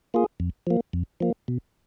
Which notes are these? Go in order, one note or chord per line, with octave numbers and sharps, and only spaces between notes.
A#3 F4 G#4
F2
F3 A#3
F2
F3 A#3
B2